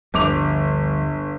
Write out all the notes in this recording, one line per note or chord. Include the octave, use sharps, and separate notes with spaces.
G1 D2 F3 G3 D6 F7